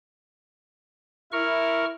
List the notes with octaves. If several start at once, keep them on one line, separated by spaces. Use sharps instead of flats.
E4 A#4 C#6 F6